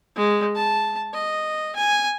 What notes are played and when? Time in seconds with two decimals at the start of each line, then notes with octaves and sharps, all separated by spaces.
0.16 G#3
0.56 A5
1.14 D#5
1.76 G#5